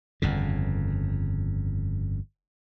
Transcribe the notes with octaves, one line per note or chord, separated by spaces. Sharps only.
G1 F2 C#3